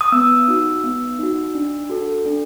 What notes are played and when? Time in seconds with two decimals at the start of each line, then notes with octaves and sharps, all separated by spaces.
0.01 D#6
0.12 B3 E6
0.48 D#4 F#4
0.84 B3
1.19 D#4 F#4
1.55 D4
1.90 F#4 A4
2.25 D4